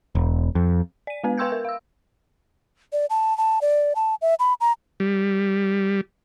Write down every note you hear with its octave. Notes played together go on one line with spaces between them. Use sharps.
E1
F2
D5 D#7
G#3 B3 B4
B4 G5 C6 E6 G6 G#6
A#4
F5 E6
D5
A5
A5
D5
A5
E5
B5
A#5
G3